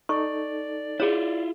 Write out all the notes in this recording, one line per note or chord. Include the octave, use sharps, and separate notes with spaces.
D#4 A4 D5 C#6
E4 F4 G#4 C#5